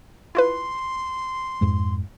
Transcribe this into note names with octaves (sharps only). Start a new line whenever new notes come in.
E4 F4 B4 C6
F2 G#2 G#3